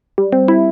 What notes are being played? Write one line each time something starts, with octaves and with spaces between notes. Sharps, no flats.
G3
C4
E4